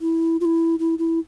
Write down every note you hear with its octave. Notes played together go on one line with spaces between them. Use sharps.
E4
F4
E4
E4
E4